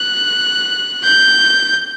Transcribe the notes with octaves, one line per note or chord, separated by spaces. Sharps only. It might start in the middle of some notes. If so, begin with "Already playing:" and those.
Already playing: F#6
G6